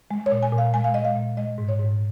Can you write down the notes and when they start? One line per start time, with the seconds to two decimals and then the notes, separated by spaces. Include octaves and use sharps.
0.11 G#3
0.26 C#5
0.32 A#2
0.43 G#5
0.53 A#2
0.58 F5
0.74 G#3 G#5
0.84 F5
0.94 G#3 D#5
1.05 F5
1.16 A#2
1.37 G#3 D#5
1.58 G#2
1.68 C#5
1.79 G#2